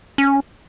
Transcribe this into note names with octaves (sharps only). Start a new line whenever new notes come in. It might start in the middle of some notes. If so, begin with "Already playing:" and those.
C#4